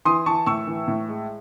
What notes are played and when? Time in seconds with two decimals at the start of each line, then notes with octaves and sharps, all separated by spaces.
0.05 E3 C6 D#6
0.26 E3 A5 C#6
0.46 A2 C#6 E6
0.67 E3
0.88 A2
1.09 G#3